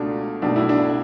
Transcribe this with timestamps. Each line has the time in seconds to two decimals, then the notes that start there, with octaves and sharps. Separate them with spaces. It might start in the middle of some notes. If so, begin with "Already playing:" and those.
Already playing: C#2 B2 A3 D4
0.42 B1 B2 A3 D4
0.56 E4
0.69 D4